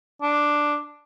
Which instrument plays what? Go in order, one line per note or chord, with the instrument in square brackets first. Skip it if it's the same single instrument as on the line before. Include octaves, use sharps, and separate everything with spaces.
[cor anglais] D4